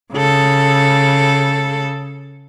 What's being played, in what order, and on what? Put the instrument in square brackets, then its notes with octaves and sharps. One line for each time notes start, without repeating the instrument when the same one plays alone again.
[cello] C#3 A4